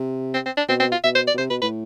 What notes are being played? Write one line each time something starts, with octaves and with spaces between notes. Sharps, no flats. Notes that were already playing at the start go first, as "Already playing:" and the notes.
Already playing: C3
C4
C4
D4
B2 C4
C4
F4
B2 E5
C5
D5
B2
C3 C5
B2 B4
A2 B4